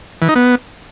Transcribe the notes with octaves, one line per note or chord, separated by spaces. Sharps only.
E3
D#4
B3